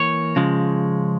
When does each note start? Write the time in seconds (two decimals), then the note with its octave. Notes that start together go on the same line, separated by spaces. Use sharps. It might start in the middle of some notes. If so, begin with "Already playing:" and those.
Already playing: E3 A#3 C#5
0.36 C#3 F3 G#3